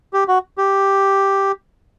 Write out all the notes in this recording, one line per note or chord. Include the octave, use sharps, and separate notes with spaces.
G4
F#4
G4